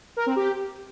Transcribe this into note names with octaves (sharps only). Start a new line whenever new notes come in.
A#4
C4
G4